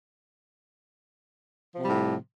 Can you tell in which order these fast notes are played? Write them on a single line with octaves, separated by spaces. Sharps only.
F3 C3 G3 A2